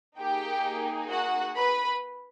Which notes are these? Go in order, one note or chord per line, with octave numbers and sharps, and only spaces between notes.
A#3 D#4 G4 G#4 G5
F#4 F#5
B4 B5